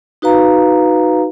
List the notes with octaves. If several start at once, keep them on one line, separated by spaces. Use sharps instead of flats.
D#4 F#4 B4 F5 A#5